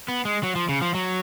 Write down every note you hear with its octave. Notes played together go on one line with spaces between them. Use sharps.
B3
G#3
F#3
F3
C#3
F3
F#3